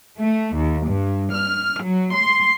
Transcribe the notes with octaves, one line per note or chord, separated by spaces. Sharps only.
A3
D#2
G2
F6
F#3
C6